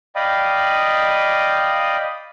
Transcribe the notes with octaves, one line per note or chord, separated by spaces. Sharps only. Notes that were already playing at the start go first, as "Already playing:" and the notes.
D5 D#5 F5 G5 B5 D#6